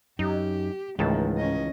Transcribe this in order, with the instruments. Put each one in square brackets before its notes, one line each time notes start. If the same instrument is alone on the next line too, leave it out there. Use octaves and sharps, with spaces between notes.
[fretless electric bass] F#2 [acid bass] D#4 [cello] G4
[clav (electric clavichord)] C#2 D#3 A5 [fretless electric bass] G#2 [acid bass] E3 [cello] A3
[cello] C#4 D#5